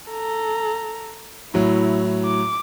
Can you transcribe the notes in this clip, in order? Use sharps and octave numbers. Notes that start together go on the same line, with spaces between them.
A4 A#5
A2 F#3 E4
D6